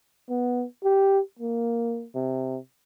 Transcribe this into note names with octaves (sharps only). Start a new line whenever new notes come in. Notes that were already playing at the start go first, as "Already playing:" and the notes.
B3
G4
A#3
C3